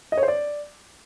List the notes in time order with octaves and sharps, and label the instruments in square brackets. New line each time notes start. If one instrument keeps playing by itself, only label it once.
[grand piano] D#5
C#5
C5
D5